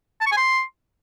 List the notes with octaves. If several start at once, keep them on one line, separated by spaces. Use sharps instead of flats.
A5
C#6
G#5
C6